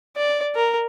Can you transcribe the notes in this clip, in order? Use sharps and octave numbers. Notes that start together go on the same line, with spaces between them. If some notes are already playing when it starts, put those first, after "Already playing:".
D5
A#4